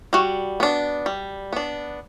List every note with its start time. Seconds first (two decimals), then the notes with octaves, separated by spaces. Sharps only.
0.13 G3 F#4
0.60 B3 D4
1.06 G3
1.53 B3 D4